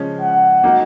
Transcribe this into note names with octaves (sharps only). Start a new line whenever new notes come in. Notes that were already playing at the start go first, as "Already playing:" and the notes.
Already playing: C#3 F3 G#3 C#4
F#5
F#3 A#3 D#4